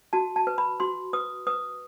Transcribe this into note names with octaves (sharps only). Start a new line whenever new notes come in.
F#4 A5
A5
B4
B5
F#4 C6
B4 D#6
B4 D#6